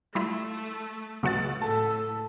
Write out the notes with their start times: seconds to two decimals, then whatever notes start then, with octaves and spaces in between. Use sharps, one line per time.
0.15 G3 A3 E4 F4
1.23 C#2 C#3 F#3 F#4 F#5 A6
1.61 A2 A4 A5